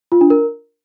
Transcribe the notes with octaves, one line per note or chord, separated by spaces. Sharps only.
F4
D4
A#4